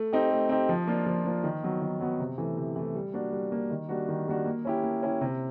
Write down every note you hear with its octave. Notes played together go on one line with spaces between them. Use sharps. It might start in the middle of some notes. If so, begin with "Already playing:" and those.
Already playing: A3
C4 D#4 G4
A3
C4 D#4 G4
F3
A#3 D4 F4
F3
A#3 D4 F4
D#3
F#3 B3
D#3
F#3 B3
C3
E3 A3
C3
E3 A3
G3
A#3 D4 F#4
G3
A#3 D4 F#4
D#3
G3 A#3 D4 F#4
D#3
G3 A#3 D4 F#4
A#3
C#4 E4 G4
A#3
C#4 E4 G4
C3